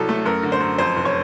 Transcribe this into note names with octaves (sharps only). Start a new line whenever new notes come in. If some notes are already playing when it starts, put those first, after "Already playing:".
Already playing: C2 F#3 A4
A3
F#2 A#4
D3
C5
F#2
F2 C5
F1
C#5